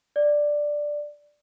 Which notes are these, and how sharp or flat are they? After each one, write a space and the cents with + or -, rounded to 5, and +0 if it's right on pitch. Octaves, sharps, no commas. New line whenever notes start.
D5 +5